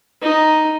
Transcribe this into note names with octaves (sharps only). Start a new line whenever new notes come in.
D#4